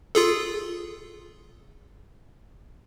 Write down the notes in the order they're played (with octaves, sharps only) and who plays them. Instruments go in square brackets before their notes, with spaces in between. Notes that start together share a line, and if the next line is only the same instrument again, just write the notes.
[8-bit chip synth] F4 G#4 A4